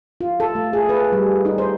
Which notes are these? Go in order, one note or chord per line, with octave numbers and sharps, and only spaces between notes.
F4
A4
A3
G#4
B4
G3
D#4
C5